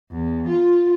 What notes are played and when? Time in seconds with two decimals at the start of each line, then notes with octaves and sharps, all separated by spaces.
0.11 E2
0.48 F4